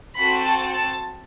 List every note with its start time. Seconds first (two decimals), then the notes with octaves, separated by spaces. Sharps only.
0.15 C4 F#4 A4 B5
0.44 A5
0.73 A5